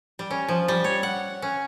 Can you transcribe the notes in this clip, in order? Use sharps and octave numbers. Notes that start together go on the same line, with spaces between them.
G3
C#4
F3
G3
C#5
F#5
C#4